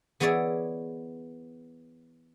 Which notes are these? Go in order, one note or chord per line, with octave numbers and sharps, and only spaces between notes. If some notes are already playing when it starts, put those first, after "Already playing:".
E3 B3 G#4 C#5 D5 E5